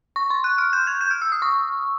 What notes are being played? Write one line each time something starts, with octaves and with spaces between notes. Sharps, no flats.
C#6
C6
F#6
F6
G6
G#6
G6
F6
E6
D#6
C#6